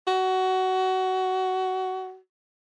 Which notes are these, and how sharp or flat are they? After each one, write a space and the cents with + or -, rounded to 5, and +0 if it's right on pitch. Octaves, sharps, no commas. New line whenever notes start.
F#4 +20